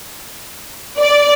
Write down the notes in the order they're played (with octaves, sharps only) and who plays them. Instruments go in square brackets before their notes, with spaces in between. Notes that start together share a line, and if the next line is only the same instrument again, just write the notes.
[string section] D5